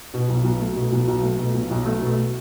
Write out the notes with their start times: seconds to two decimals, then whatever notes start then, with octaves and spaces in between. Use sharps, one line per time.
0.14 B2
0.29 B1
0.44 B1
0.60 A3
0.76 B2
0.92 B1
1.08 B1
1.23 A3
1.39 B2
1.54 B1
1.71 B1
1.86 A3
2.02 B2